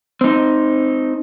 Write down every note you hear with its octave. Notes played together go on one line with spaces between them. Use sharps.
C4 D#4